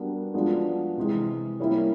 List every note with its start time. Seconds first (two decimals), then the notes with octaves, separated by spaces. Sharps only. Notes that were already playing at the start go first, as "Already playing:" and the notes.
Already playing: G3 B3 D4 F#4 A#4
0.34 F3 G#3 B3 D4 F#4
0.97 C3 E3 G#3
1.59 G3 A#3 C#4 E4